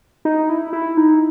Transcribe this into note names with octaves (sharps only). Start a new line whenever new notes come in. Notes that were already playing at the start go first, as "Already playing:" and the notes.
D#4
E4
E4
D#4